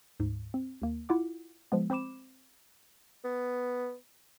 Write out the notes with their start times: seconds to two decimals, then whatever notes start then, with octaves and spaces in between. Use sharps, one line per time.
0.20 D2 G#2
0.54 C4
0.82 D#2 A#3
1.09 E4 F4 F#5 D6
1.72 F3 G#3 B3
1.90 C4 C5 B5 D6 E7
3.24 B3